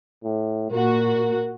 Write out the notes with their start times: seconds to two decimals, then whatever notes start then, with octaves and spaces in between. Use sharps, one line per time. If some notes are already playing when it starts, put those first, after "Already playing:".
0.24 A2
0.70 A#2 F#4 A#4